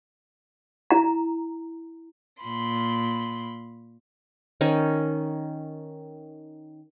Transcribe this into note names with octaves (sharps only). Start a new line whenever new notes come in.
E4 A#5
A#2 B5 C6
D#3 C#4